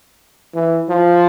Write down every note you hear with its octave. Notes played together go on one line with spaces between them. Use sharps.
E3
F3